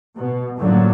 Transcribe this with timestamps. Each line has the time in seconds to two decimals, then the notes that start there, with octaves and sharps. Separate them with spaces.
0.16 B2
0.59 F#2 A2 D3 F3 F#3 A#3